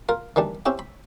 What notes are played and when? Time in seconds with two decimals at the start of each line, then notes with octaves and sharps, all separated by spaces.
0.09 F4 A#4
0.36 D#3 E3 G3 D4
0.66 C4 C#4 E4 G4 G5
0.79 B5